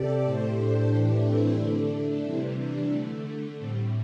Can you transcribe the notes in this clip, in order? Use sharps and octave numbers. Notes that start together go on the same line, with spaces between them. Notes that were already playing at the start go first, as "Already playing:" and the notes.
Already playing: C3 G4 A4 D5
A2 A3 G4 C5
D4 G4
A2 E3 A3 D4 G4
C4 E4
D3 A3 D4
C3 E3 G3 C4 E4
D4
D3 A3
A2 G3 C4